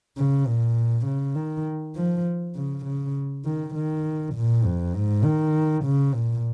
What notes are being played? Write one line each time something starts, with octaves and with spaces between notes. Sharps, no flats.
C#3
A#2
C#3
D#3
F3
C#3
C#3
D#3
D#3
A#2
F2
G#2
D#3
C#3
A#2